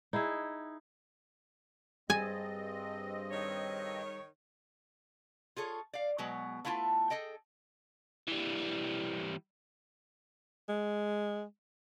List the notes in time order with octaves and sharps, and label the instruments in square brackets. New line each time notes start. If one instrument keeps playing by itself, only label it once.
[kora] D#4 E4 G#4 E5
[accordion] G2 C4 D#5 [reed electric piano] G3 G#4 A6 [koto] G#5
[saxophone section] D#3 C#5
[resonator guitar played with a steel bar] F4 G#4 A4 C#5
D5 F5
B2 F#3 G#3 B3
A3 B3 E4 F4 A5
G#4 A4 D#5 G5
[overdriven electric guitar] E3 G3
[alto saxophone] G#3